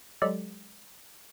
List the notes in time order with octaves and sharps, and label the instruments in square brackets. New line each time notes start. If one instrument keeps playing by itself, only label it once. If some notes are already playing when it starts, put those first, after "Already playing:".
[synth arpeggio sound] F#3 G#3 G4 A4 D5